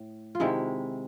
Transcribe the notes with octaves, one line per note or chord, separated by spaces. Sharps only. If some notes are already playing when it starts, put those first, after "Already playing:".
Already playing: A2
F4
C3 D#3 G#3 E4